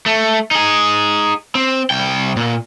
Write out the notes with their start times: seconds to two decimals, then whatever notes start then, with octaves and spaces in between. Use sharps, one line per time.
0.06 A3
0.51 D#4 G#4
1.55 C4
1.90 C2 G5
2.37 A#2